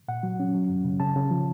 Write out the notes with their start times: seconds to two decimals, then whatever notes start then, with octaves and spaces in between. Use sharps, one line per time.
0.08 A#2 F#5
0.23 F#3
0.40 C#4
0.55 F#3
0.69 F#2
0.85 C#3
1.00 C#3 A5
1.16 C#3
1.31 F3